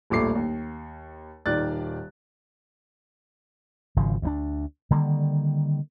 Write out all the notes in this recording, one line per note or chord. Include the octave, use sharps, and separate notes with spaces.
D#1 A#1 A3 D6 C7
D#2
D#1 D#3 D5 F#6 A6
G#1 C#3 F3
D2 G3 D4
D3 D#3 G3 A#3